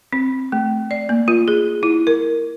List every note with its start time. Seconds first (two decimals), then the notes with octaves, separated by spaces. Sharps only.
0.13 C4
0.52 A3
0.91 D5
1.09 A#3
1.28 F4
1.48 G#4
1.83 E4
2.07 A#4